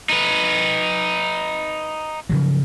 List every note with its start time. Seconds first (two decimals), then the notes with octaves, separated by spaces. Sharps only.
0.10 D#4 B4
2.29 C#3 F3 F#3